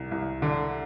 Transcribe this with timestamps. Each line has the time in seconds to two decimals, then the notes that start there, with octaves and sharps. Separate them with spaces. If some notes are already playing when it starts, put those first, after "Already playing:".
Already playing: C2
0.11 C2
0.42 D3